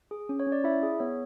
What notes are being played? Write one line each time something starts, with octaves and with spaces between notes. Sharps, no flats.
G#4
C#4
C#5
C#4
D5
E4 E5
G#4
B3 C#5